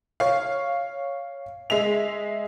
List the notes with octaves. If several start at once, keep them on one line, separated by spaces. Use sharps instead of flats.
C#5 F5
G#3 E5 F7